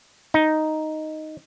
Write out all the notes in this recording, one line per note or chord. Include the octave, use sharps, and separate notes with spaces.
D#4